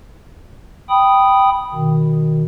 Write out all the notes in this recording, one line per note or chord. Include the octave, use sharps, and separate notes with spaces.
G5 B5 D#6
B2 D#3